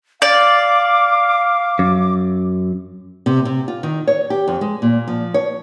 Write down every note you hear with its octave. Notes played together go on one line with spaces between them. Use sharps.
D5 F5 D6
F#2
C3
C3
F4
D#3
C#5
G4
F2
G#3
A#2
F3
C#5